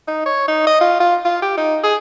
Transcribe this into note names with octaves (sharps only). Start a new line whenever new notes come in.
D#4
C#5
D#4
D#5
F4
F4
F4
G4
D#4
G#4